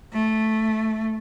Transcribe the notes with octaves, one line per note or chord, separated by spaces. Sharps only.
A3